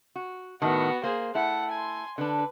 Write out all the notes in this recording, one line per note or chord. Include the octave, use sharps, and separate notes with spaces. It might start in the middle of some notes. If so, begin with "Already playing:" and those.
F#4
A2 D#3 B3 F#4
A#3 G#4 C5
A3 E4 F#5
G#5 C6
D3 D4 B4